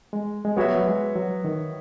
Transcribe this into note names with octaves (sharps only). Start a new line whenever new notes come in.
G#3
G#3
F#3 B3 F#4 C#5 E5
F#3
G#3
F#3
D#3